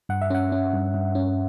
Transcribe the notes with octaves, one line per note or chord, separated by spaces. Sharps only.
G2 F#5
E5
C#4 F#5
C#4
G2
G2
C#4